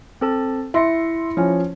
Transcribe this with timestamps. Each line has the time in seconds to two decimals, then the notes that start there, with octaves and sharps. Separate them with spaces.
0.21 C4 A4 A5
0.74 E4 E5 C6 A#6 C#7
1.37 F3 C#4